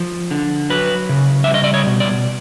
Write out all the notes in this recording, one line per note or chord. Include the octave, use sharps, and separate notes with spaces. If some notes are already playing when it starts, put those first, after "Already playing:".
Already playing: F3
D3
F#3 B4
C#3
G3 E5
D#5
D5
C#5
B2
D5